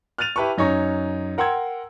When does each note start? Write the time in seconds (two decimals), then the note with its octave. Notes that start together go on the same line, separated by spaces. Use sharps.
0.18 F6 F#6 A6 D#7 F7
0.36 E4 G4 B4 A5 C#6
0.58 F#2 D#4 C#5 C#6 G#6 A#6
1.38 A#4 F#5 G5 C6 E6 G#6